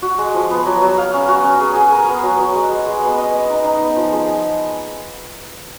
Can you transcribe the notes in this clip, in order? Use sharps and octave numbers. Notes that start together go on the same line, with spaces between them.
F#4
G#3
F3
B3
F#3
F#3
F5
C#4
F#4
C#4
G#4
G#4
A#4
B3
F#3
F#3
G#3
G#3
G#3
B3
D#5
D#5
D#4
D#4
B3
F3
G#3